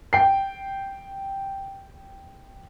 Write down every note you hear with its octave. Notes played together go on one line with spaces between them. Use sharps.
G5 C7